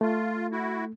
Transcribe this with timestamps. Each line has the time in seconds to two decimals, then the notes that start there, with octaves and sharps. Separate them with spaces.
0.01 A3 F4
0.52 E4 F#4